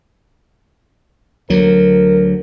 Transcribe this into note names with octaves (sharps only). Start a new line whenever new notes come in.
D2 F#3 A#4